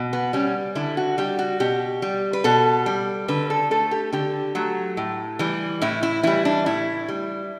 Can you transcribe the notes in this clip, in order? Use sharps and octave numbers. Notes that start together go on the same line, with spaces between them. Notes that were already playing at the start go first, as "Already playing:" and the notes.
Already playing: B2
B3
G3 C#4
D3 E4
F#4
G3 G4
F#4
B2 G4
G3
B4
B2 A4
G3
D3 B4
A4
A3 A4
G4
D3 G4
F#3 A3
A2
E3 G3
A2 E4
E4
E3 G3 E4
D4
A2 E4
G3